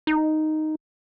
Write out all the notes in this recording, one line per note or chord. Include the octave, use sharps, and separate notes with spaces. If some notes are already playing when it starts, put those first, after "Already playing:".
D#4